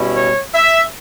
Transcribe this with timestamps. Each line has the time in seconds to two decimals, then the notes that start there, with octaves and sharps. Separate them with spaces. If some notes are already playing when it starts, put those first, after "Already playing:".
Already playing: B2 G3 C#4 E4
0.16 C#5
0.55 E5